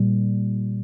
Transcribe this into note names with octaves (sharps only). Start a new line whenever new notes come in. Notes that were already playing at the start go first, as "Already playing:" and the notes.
Already playing: A#2 G3 A#3